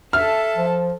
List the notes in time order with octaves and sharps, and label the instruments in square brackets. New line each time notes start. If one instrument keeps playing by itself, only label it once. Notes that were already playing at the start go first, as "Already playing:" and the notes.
[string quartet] A4 A5 [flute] E5 [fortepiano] F6
[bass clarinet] F3